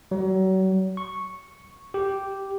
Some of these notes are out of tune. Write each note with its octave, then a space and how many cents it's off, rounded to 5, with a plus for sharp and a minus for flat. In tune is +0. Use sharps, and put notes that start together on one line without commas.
F#3 +35
C#6 -5
G4 -5